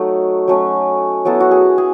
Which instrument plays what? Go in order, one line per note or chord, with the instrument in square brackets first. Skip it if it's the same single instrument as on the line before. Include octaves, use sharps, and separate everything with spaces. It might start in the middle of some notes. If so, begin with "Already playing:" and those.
Already playing: [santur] F#3 A3 D#4
F#3 A3 C#4
F#3 B3 E4 A4
F#4
G#4
G#4